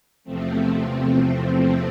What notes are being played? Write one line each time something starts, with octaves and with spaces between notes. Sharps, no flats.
E2 C3 F3 A3 C4